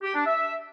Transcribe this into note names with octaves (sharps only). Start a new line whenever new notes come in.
G4
D4
E5